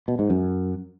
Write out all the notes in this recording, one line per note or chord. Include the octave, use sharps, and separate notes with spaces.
B2
G#2
F#2